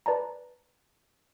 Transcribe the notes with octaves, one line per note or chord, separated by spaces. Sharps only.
B4 D5 A5 A#5